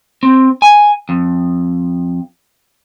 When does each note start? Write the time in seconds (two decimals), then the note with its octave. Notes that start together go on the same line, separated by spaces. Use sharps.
0.23 C4
0.62 G#5
1.09 F2